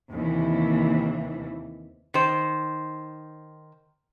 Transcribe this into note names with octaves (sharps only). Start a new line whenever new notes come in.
D#2 C3 E3
D#3 C5